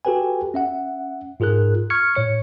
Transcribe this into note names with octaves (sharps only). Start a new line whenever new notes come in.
F#4 G4 A4 B4 G5 G#5
C#4 E5 F#5
G#2 F4 G#4 A#4 F#6
C#6 F6 G#6 C#7
A2 C#5 C#7